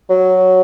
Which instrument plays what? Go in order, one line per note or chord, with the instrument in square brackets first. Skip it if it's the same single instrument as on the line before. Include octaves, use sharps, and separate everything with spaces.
[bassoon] F#3